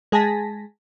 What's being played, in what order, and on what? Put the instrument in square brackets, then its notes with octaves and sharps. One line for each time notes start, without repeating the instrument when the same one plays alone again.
[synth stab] G#3 G#4 G#5 A5 A#6 B6